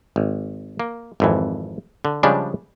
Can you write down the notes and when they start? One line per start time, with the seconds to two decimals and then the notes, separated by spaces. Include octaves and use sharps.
0.16 G#1
0.80 A#3
1.20 G#1 F2 E3
2.05 D3
2.23 C#3 F3 G3 G#3 D4